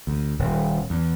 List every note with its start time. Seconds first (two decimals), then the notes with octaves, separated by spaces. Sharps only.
0.07 D2
0.39 D#1
0.90 E2